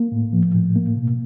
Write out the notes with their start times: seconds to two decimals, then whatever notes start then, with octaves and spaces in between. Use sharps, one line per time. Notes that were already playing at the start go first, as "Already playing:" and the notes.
Already playing: A#3
0.12 A2
0.33 F3
0.54 A2
0.76 A#3
0.97 B2